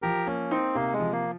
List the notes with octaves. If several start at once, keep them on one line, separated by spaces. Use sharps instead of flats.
F3 G4 A#4
A#3 C#4
C4 D#4
C3 A#3
G#3
F3
A#3